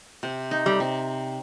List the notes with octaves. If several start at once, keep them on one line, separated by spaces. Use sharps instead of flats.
C3
D#4
G3
C3